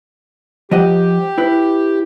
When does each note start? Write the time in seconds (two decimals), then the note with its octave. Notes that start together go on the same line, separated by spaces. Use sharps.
0.71 F3 G4 D#5 F#5
1.38 E4 B4